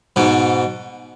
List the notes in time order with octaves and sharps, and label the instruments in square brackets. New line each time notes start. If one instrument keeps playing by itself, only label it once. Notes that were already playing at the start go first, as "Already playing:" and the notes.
[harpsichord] G#2 B2